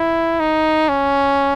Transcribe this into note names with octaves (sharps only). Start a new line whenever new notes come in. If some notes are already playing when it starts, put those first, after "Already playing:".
Already playing: E4
D#4
C#4